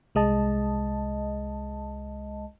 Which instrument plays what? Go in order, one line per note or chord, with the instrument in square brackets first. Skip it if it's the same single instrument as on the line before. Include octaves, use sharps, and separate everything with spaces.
[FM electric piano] C2 G#3 D#5 A5